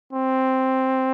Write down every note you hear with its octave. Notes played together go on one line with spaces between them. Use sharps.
C4